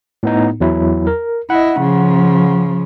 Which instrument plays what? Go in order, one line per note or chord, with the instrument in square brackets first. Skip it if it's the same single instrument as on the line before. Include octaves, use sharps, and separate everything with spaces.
[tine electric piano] A2 B3 D#4
E2 F#3 E4
A#4
[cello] E4 D#5 [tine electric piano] F#5
[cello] C#3 F3